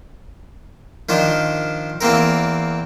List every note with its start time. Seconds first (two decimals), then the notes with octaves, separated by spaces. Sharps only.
1.09 D#3 F3 D4 C5
2.01 E2 A#3 C4 A#4